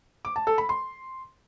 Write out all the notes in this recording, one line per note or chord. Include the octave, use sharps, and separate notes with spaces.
D6
A5
A4
B5
C6